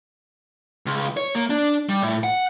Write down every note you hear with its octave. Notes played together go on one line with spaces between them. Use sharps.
C#2
C#5
A#3
D4
G3
A2
F#5